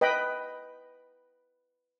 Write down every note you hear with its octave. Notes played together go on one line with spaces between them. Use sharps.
B4 D#5 G5 B5